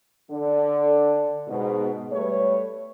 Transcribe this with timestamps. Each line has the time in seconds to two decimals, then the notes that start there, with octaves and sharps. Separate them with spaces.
0.31 D3
1.48 G#2 B2
2.12 G3 A3 B4 C#5